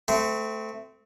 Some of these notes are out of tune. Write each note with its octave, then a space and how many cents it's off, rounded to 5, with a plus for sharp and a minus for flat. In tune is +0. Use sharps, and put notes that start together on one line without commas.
A3 +0 C4 -25